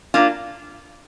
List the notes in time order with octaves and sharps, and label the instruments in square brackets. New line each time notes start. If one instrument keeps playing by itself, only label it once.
[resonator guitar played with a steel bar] A#3 D4 F4